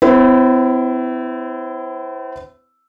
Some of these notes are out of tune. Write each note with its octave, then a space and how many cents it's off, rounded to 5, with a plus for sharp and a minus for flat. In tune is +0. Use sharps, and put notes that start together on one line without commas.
C4 -45 E4 +0 C5 +35